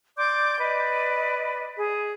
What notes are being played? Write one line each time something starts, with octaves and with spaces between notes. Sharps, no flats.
D5 C6 D6 G6
B4 D5 D#5
G#4